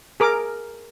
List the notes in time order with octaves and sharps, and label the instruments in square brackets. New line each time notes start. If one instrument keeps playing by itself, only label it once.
[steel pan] G#4 A#4 D6